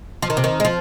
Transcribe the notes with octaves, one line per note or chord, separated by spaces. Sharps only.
F3
D#3
C3
D#3
G#3
F3